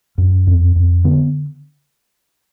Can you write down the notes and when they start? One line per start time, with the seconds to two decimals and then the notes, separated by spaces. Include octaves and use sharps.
0.18 F#2
0.47 F2
0.76 F2
1.04 D3 B3